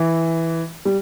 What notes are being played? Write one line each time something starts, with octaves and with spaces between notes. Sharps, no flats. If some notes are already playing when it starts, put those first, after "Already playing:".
Already playing: E3
G3